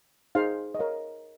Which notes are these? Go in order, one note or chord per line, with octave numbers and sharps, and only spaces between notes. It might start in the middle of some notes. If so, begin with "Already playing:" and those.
D#4 G#4 C5 F5
D#5
A#4 C#5 F5